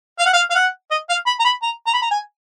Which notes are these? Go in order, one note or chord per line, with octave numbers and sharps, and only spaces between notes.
F5
F#5
F5
F5
F#5
D#5
F5
B5
A#5
B5
A#5
A#5
B5
A#5
G#5